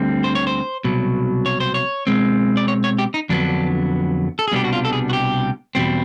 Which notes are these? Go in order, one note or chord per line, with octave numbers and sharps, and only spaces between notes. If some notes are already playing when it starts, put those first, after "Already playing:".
Already playing: D2 D3 G3 C4
C5
C#5
C5
C2 B2 F#3
C#5
C5
C#5
B2 G#3 C4
D5
C#5
C#5
G4
D#4
F2 D3 F#3 B3 D4
A4
G#4
C2 B2 G3 B3 D4 G4
F#4
F4
A4
G#4
F#4
G4
E2 B2 G3 C4